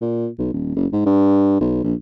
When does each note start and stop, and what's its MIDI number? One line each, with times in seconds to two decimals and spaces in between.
0.01 0.28 46
0.39 0.50 35
0.53 0.72 27
0.76 0.86 30
0.92 1.04 44
1.06 1.60 43
1.60 1.82 35
1.84 1.94 34